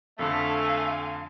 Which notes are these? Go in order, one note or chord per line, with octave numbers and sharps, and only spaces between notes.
F2 D3 A3 F5 G#5